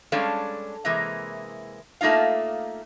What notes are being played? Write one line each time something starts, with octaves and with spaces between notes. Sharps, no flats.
G3 G#3 C#4 D4 A4 F5
C3 E3 G#3 A#3
A3 A#3 D#4 F4 F5